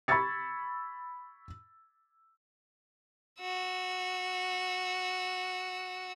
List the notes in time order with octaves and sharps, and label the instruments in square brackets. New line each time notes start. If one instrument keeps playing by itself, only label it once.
[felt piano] B5 C#6 E6 G#6 A6 C#7
[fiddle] F#4 E6